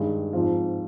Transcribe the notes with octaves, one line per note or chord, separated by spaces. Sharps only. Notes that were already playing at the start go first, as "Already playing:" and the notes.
Already playing: G2 D#3 G#3
G#2 F3 C4 F4